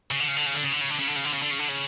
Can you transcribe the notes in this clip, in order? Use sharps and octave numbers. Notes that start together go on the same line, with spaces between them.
C#3
D3
C#3
D3
C#3
D3
C#3
D3
C#3
D3
C#3
D3
C#3
D3
C#3
D3
C#3
D3
C#3